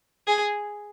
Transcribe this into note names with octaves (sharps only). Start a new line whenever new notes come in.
G#4